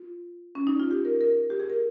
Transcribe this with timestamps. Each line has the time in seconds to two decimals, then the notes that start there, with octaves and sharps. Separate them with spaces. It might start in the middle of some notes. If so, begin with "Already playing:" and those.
Already playing: F4
0.55 C#4
0.67 D#4
0.80 F4
0.91 G4
1.05 A#4
1.21 A#4
1.50 G4
1.60 G#4
1.70 A#4